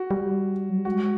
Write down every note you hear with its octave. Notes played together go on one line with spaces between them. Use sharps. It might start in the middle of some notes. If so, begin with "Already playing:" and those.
Already playing: F#4
G3
F#3
G3
G#3 F#4